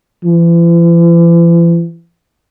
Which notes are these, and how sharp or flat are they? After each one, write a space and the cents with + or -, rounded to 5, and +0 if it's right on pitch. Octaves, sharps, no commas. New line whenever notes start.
E3 +45